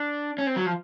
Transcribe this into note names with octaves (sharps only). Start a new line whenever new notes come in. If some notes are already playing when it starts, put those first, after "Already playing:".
Already playing: D4
C#4
C4
F#3
F3